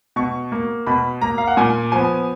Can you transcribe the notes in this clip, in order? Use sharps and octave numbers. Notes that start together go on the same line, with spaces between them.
B2 C#6
A#3
B2 B5
A#3 A#5
F5
F#5
A#2 G#5
F3 B3 G#5